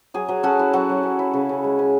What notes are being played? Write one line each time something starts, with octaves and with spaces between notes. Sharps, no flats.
F#3 G#4
F#3
C#4 F#4 A4
E4
F#3 F#4 A4
F#3
C#4
E4
C#3
C#3
G#3
C#4